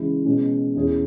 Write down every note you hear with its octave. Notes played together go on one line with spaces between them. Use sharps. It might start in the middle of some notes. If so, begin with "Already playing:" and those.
Already playing: C#3 E3 G#3 E4 G#4
B2 G#3 C#4
E2 E3 C#4 G#4